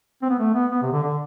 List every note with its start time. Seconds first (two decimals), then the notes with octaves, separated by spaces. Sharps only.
0.22 C4
0.30 B3
0.39 A3
0.54 B3
0.72 B3
0.82 C3
0.93 D3
1.03 D3